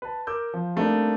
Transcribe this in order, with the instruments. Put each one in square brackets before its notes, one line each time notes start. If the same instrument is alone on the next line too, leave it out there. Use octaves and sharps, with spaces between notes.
[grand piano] B4 A5
A#4 D6 E6 G6
F3
G3 A3 A#3 C4 D4 D#4